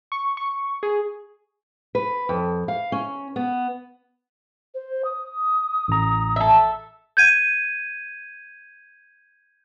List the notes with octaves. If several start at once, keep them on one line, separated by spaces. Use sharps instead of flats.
C#6
C#6
G#4
B4
F2
F5
C#4
B3
C5
D#6
A1 A#5
A4 E5
G6 G#6 D#7